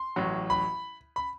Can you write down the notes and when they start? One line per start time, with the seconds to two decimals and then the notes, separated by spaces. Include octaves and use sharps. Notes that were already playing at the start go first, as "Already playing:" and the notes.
Already playing: C6
0.16 A1 A2 F#3
0.50 B5
1.16 B5